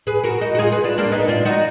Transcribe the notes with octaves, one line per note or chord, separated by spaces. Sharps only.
G#4 B4
F#4 A#4
D#4 F#4
F#4
F4 G#4
G#4 B4
D4 F4
A#3 D4
B3 D#4
D4 F4
D#4 F#4